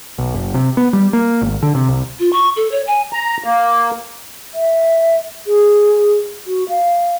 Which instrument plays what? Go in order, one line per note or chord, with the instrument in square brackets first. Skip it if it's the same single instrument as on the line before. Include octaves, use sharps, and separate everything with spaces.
[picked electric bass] B1
F#1
C3
B3
G3
A#3
G#1
D3
C3
C2
[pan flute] F4
C#6
A4
C#5
G#5
[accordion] A#5
A#3
[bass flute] E5
G#4
F#4
F5